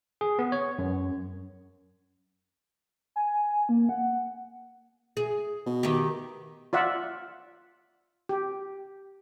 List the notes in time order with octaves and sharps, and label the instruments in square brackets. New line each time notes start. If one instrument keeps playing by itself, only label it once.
[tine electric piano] G#4
B3
C#5
F#2
[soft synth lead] G#5
A#3
F#5
[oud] G#4
[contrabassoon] B2
[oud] D#3 G4
[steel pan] F4 D5 E5 F#5
G4